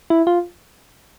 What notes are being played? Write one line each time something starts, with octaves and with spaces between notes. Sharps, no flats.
E4
F4